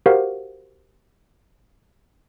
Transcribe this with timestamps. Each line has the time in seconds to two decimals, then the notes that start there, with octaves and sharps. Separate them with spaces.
0.06 F#4 G4 A#4 C5 F5 F#5